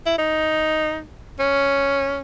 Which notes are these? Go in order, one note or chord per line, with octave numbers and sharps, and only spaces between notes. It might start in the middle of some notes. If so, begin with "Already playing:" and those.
E4
D#4
C#4